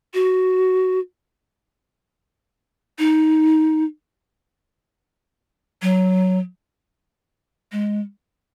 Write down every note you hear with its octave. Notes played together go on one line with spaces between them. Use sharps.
F#4
D#4
F#3
G#3